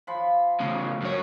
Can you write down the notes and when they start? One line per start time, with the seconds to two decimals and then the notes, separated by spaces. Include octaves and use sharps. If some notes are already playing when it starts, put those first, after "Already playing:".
0.07 F3 B5
0.60 A2 C#3
1.02 F#2 C#5